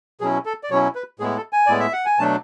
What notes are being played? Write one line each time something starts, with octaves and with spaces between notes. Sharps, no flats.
B2 F#3 C#4 E4 G#4
A4
D5
B2 F#3 C#4 E4 C#5
B4
A2 G#3 B3 E4 G#4
A4
G#5
A2 G#3 B3 E4 D5
E5
F#5
G#5
B2 F#3 A3 D4 A5